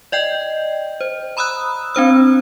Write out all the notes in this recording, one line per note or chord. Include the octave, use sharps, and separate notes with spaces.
D5 D#5 G5 G6
C5
A#5 B5 D#6 E6 F#6
C4 D4 C5 E6